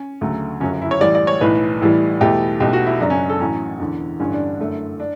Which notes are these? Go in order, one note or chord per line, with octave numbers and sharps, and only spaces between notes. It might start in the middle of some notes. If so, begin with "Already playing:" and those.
Already playing: C#4
D2 C#3 F#3 A3
G1 F#2 C#3 F#3 C#4
E4
C#5
A1 A2 E3 G3 D5
D5
C#5
B1 A2 E3 B4
A1 A2 E3 G3
E2 B2 A3 G4
B1 B2 A3 G4
F#4
E4
F#2 C#3 F#3 D4
C#4
A4
A1 A2 F#3 C#4
E1 E2 D3
A1 G2 D3 G3 C#4
D4
F#2 D3 A3
D4